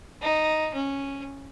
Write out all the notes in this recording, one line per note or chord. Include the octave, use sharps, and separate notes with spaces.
D#4
C#4